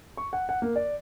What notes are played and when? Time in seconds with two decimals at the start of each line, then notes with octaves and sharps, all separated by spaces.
0.17 C#6
0.33 F#5
0.49 F#5
0.62 A#3
0.76 D5